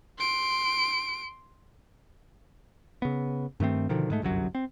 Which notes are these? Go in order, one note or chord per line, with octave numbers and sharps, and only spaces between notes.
C6 D7
C#3 B3
G2 D#3 A3 C4
B2 D3 D#3 F3
G#2 G#3 A3
G1 C2 F#2 F#3
C4